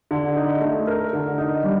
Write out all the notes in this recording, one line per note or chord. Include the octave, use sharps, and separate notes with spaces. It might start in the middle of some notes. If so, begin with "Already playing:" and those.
D3
D#4
A3
A#4
D3
D#4
G3